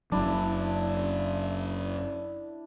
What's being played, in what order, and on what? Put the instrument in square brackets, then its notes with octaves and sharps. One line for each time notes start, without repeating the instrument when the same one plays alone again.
[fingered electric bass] F#1 F#3 [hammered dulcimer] D4 E4